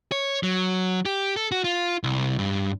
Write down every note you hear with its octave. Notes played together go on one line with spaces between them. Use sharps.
C#5
F#3
G4
A4
F#4
F4
C2
G2